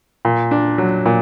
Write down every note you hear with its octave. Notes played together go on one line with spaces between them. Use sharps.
A#2
D4
F#3
A#2